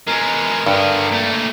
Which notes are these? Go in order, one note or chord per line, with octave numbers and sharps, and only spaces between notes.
B2 G#3 A#4
G2 D3 B3
A#2 A3